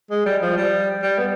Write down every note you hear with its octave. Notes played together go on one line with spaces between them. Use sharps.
G#3
G3
F3
G3
G3
B3